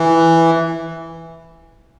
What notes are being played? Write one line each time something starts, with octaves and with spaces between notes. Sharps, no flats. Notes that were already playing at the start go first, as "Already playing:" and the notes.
Already playing: E3